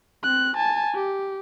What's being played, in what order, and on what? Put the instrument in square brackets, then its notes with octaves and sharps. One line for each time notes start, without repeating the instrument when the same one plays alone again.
[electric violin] C4 F#6
G#5 A5
G4